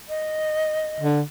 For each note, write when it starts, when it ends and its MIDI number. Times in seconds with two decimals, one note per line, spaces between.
0.09 1.06 75
1.01 1.21 50